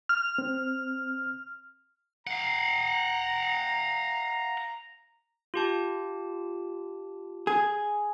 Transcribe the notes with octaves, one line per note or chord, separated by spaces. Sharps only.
F6
C4
F5 F#5 A#5
F4 G4 A5
G#4